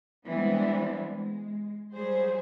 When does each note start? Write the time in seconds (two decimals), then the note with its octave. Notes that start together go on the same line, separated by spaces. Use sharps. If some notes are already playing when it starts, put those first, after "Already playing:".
0.25 E3 G3 G#3 B3 C4 D4
1.09 G#3
1.93 F#3 G3 G#4 C5